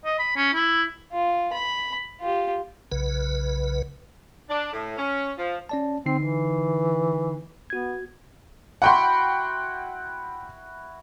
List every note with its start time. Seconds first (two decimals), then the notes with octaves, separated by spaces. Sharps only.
0.05 D#5
0.19 B5
0.36 C#4
0.53 E4
1.12 F4
1.53 B5
2.21 F4 G4
2.92 B1 C#3 B4
4.49 D4
4.72 A2
4.97 C#4
5.38 F3
5.69 C#4 D5 A5
6.06 D3 C4 D#4 C7
6.19 E3
7.70 B3 F#4 G#6
8.82 E4 F#4 F#5 G5 B5 C6